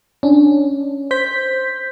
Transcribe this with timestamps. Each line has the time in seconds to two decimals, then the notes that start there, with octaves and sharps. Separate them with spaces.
0.23 C#4 D4
1.11 C5 G6 B6